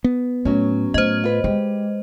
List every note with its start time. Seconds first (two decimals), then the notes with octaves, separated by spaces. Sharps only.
0.04 B3
0.45 A2 F#3 C#4
0.94 A2 C5 D#5
1.24 F4 B4
1.44 G#3 G4